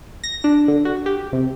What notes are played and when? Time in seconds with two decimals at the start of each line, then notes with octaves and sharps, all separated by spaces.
0.24 A#6
0.44 D4
0.68 D3
0.85 F#4
1.06 G4
1.33 C3